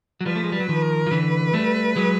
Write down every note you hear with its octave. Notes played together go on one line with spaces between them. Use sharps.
F#3
F3 G3 B4
A3
G#3
G3 B4
F#3
D#3 F3
A#4
F3
D3 E3 B4
G3 A3
F#3 G#3